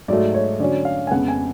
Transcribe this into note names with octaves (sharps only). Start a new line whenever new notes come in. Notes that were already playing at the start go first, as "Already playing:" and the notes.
G#2 F#3 A3 D5
C#5
D3 F#3 C#4 D5
F5
G#5
F2 C#3 G#3 B3 F#5
G#5